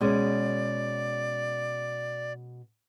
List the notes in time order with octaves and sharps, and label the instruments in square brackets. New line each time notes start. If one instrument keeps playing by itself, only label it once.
[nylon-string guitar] B2 G#3 C#4 [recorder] D5